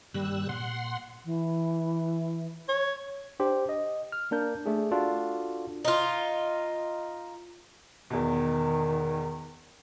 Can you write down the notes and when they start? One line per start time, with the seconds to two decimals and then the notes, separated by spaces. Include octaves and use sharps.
0.14 G2 D#3 G3 A#3 E6 F#6
0.49 A#2 F#5 C6
1.25 E3
2.69 C#5
3.40 D4 G4 C5
3.69 D#5
4.12 F6
4.31 A#3 D4 A#4 G6
4.66 A3 D4 G#4
4.91 D4 F4 F#4 A4
5.85 D#4 F4
8.10 E2 B2 D#3